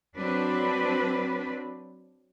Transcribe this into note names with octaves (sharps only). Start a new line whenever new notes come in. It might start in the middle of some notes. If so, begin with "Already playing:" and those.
F#3 C4 D4 B4